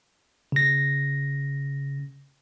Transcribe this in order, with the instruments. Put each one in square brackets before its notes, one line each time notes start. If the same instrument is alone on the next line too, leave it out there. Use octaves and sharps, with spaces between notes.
[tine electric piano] C#3 A#6